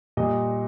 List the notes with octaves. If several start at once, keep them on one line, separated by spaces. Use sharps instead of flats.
A#2 G3 D#5